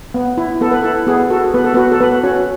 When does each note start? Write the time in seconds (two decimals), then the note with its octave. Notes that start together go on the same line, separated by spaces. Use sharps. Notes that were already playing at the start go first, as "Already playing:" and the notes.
0.14 B3
0.37 E4
0.61 B3 A4
0.71 B4
0.83 E4 A4
1.07 B3 G#4
1.30 F#4 A4
1.54 B3 B4
1.64 A4
1.74 B3 F#4 B4
1.92 A4
2.00 B3 B4
2.24 C#4 F#4 C#5